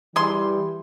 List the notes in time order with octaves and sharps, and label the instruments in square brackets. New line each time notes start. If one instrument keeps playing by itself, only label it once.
[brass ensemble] E3 G3 [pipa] G#4 C6